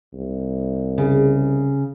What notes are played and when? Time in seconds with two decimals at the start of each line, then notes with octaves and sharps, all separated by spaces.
0.13 C2
0.98 C#3